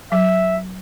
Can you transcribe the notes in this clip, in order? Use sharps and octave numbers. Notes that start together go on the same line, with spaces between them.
F#3 E5